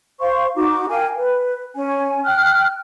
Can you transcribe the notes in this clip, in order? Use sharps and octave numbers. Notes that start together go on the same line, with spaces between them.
C5 F5 C6 C#6
D#4 F#4 D6
A#4 F5 G5 G#5
B4
C#4 G#5
G5 F6 F#6